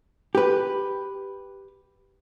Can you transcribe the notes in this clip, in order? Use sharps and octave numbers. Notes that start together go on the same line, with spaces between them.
G4 B4